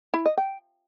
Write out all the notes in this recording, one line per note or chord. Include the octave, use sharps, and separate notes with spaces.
E4
D#5
G5